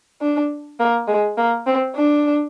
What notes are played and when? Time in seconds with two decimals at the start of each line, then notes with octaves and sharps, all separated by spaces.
0.21 D4
0.79 A#3
1.08 G#3
1.37 A#3
1.67 C4
1.96 D4